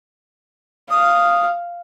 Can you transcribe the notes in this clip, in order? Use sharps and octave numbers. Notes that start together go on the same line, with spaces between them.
F5 D#6